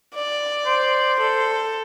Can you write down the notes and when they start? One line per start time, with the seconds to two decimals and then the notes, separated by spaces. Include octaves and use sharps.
0.15 D5
0.66 C5
1.19 A4